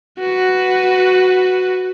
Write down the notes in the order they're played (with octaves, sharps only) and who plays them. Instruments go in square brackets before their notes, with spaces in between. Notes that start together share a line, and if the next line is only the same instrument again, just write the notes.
[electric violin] F#4 B4